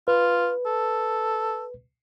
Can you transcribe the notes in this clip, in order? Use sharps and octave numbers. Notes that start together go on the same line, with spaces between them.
F4 B4
A4